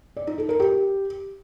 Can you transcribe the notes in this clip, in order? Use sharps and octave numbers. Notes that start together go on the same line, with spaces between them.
D5
D#4
A4
A#4
G4